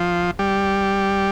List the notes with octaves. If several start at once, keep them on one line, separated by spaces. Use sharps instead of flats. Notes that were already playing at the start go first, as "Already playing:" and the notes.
Already playing: F3
G3